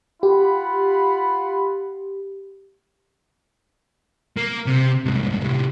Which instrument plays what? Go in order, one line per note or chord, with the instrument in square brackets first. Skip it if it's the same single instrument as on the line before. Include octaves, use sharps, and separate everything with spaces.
[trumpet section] F4 F#5 B5 [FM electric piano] G4
[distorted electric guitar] A#3
C3
C2 G#2
A2 C3